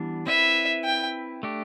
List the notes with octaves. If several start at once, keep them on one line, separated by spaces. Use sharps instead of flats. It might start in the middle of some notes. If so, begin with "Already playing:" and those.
Already playing: E3 G3 B3 D4
C4 E4 B4 E5
G5
A3 D4 G4